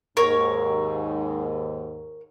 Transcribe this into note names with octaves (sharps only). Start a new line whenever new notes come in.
D#2 G#2 A#4 C#5